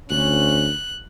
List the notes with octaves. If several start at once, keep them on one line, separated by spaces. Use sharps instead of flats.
D2 C#4 F#6